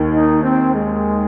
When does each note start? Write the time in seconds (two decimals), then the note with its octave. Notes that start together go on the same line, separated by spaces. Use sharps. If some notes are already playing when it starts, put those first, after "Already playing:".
Already playing: D#2 D#3
0.13 D#4
0.43 C4
0.74 G#3